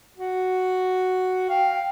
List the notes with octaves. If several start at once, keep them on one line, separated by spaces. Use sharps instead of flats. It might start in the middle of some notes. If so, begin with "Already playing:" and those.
F#4
F5 G5